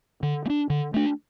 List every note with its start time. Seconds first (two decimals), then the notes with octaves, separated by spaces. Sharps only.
0.23 D3
0.45 A3
0.50 D4
0.70 D3
0.94 A3 D4